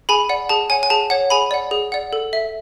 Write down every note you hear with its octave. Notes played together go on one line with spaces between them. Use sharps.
G#4 G#5 B5
D5 F#5
G#4 A5
C#5 F#5 G#5
G#5
G#4 A5
C#5 F#5
G#4 G#5 B5
D5 F#5
G#4
D5 F#5
A4
E5